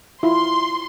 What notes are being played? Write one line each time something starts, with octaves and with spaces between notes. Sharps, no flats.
E4 F4 C6